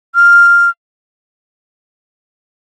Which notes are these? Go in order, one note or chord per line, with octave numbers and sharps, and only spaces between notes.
F6